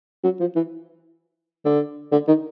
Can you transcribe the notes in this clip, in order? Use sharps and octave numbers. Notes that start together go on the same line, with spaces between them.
F#3
F3
E3
D3
D3
D#3